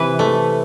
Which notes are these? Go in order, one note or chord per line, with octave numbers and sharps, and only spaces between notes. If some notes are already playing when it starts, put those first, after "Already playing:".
Already playing: C3 E3 B4
A3